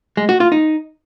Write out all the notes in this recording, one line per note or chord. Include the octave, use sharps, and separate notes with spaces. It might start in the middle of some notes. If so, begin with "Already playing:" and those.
G#3
F#4
F4
D#4